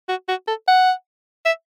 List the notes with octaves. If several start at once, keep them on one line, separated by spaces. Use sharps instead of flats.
F#4
F#4
A4
F#5
E5